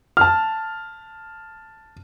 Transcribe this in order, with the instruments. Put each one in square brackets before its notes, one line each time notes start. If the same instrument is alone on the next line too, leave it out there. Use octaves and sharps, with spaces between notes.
[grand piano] A5 F6